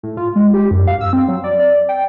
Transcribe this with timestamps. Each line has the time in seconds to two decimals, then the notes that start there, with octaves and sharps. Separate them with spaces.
0.03 A2
0.17 F4
0.36 G#3
0.54 G4
0.71 F#2
0.87 F5
1.01 E6
1.13 C4
1.28 F#3
1.44 D5
1.59 D5
1.89 G5